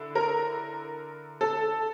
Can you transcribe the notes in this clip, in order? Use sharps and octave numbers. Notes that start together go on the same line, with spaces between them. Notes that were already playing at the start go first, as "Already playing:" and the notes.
Already playing: D3 E4
A#4
A4